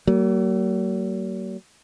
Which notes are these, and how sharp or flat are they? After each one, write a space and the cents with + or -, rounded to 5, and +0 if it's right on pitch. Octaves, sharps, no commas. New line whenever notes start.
F#3 +40 A#3 -20